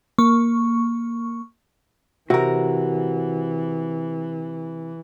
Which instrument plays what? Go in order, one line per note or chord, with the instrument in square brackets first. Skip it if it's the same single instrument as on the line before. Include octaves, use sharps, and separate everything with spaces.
[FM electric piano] A#3 C#6
[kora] C3 [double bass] E3 [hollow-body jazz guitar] F#4 A#4